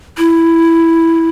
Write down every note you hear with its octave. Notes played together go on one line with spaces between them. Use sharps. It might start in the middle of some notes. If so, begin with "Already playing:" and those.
E4